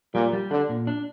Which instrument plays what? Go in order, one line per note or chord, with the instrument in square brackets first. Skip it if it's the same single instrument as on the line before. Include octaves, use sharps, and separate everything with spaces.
[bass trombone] A#2 [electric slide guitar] G3
[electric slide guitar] G3
[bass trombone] D3 [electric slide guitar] D4
[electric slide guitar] A#2
D4